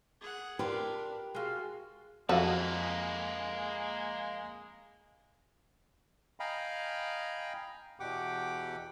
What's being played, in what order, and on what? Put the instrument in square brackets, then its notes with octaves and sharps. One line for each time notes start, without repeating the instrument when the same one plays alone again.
[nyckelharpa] G#4 F#5
[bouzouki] D4 F4 B4 [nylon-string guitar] G4 [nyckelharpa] A#4
[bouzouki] G#3 F4 [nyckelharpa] F#4
[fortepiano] F2 F5 [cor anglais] G#3 [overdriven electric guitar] A#3 B4 [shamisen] F#4 A4
[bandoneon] D#5 F5 G5 G#5 A#5 B5
E2 B2 G4 F#5 G5 D6